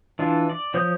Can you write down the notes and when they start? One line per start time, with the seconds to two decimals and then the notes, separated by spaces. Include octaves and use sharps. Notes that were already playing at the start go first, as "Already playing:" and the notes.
0.19 E3 D4 F4
0.49 D5
0.74 F3 C5 C#5 D#6 G6